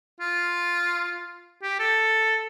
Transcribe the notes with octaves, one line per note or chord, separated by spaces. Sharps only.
F4
G4
A4